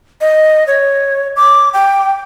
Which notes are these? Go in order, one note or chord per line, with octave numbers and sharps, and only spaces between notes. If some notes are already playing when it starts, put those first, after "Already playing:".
D#5
C#5
D6
G5